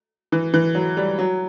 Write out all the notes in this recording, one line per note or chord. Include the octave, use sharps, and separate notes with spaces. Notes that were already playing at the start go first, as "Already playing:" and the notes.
E3
E3
F#3
G3
F#3